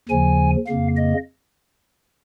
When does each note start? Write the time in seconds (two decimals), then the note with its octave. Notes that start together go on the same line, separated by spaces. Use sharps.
0.09 D#2 C#3 F3 G#5
0.67 F2 C#3 A#3 F5
0.97 D#5